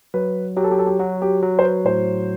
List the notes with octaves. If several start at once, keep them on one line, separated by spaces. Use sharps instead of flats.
F#3 B4
F#3 G4
A4
G4
A4
G4
F#3 F#4
G4
F#3
C5
B4
A2 C5